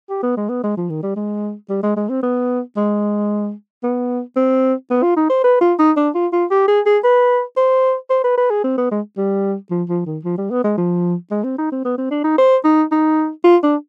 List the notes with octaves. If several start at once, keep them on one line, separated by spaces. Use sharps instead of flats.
G4
B3
G#3
B3
G#3
F3
D#3
G3
G#3
G3
G#3
G#3
C4
B3
G#3
B3
C4
B3
F4
D#4
C5
B4
F4
D#4
D4
F4
F4
G4
G#4
G#4
B4
C5
C5
B4
B4
G#4
C4
B3
G#3
G3
F3
F3
D#3
F3
G3
B3
G#3
F3
G#3
C4
D#4
C4
B3
C4
D4
D#4
C5
D#4
D#4
F4
D4